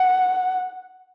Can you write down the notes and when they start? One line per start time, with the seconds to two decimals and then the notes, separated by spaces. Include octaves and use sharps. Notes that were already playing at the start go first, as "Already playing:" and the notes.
Already playing: F#5